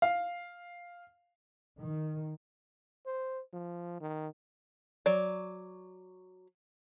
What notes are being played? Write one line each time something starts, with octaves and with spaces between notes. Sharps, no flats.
F5
D#3
C5
F3
D#3
F#3 D5